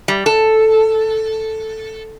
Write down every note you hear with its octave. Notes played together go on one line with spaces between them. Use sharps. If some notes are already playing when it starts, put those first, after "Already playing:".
G3
A4